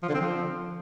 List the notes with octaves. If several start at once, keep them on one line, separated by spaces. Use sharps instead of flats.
F3
D3
C4
F3